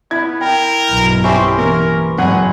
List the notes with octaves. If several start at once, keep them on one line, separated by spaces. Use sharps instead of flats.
B3 E4 G#6
A#4 G5
B1 G2 B2
C4 C#4 E4 G4 C5
E3 A#3 A#4
F#1 G#2 G#4 F#5